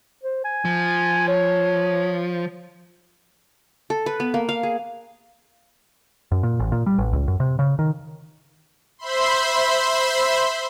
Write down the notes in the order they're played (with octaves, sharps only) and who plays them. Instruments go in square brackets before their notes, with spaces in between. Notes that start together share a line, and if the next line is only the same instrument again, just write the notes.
[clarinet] C5
G#5
[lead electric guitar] F3
[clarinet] C#5
[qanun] A4
B4
B3
A#3
F5
G#4
[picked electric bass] F#2
A#2
A1
A#2
G3
A1
C#2
F#2
C3
C#3
D#3
[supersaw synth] C5 E5 B5 C6